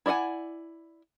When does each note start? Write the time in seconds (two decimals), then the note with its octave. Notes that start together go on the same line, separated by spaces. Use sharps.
0.06 E4 D5 D#5 F#5 G#5